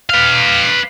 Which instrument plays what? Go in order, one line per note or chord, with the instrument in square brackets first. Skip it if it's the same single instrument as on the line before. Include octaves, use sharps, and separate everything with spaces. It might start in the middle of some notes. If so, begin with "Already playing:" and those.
[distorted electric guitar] B4 F5